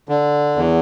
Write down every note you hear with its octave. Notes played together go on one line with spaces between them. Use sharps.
D3
E2